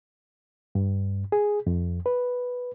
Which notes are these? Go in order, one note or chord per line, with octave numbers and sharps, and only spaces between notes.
G2
G#4
F2
B4